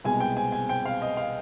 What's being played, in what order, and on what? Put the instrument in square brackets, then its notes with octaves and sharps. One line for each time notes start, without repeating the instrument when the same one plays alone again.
[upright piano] C2 B2 G#3 G#5
G5
G#5
G#5
G5
F5
D#5
F5